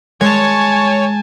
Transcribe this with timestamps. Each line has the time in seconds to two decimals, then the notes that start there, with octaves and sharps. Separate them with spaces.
0.21 G#3 C#5 G#5 A5